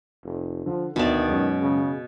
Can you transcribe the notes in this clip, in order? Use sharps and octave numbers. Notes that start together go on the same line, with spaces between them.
F1
D3 F3
D2 B2 D#3 D5 E7
F#2 G#3 C#4
C#3